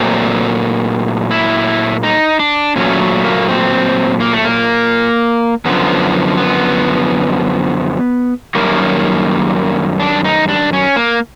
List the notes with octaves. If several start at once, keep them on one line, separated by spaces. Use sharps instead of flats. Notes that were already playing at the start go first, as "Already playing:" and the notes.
Already playing: A#2 F#3 A3 C4
E4
D#4
D4
A#2 F#3 A3 C#4
A#3
C4
A#3
A3
A#3
F#2 D3 F3 B3
B3
F#2 D#3 G3 A#3
D4
D#4
D4
C#4
A#3